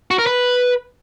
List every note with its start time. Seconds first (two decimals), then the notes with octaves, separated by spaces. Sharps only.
0.11 F#4
0.19 A#4
0.27 B4